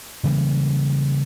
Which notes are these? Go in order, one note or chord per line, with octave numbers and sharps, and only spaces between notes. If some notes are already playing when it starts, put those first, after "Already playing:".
C#3 E3 G3 A#3